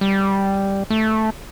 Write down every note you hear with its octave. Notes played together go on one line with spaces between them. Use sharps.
G3
A3